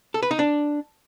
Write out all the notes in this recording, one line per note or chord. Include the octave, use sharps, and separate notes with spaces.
A4
B4
D#4
D4